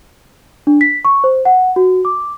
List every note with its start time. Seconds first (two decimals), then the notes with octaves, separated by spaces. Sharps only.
0.67 D4
0.81 B6
1.05 C#6
1.24 C5
1.45 F#5
1.76 F#4
2.05 D6